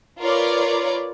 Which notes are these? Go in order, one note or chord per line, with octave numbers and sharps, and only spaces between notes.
F4 A#4 B4 C#5 D5